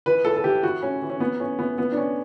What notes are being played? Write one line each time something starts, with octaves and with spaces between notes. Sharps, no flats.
E3 B4
A2 A4
A4
E3 G4
E3 F#4
A2 C#4
E3
C#4
E3 B3
A2 C#4
E3 B3
E3 B3
D4
A2 C#4